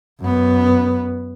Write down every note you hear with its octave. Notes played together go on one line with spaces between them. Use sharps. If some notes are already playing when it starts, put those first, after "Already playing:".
F#2 B3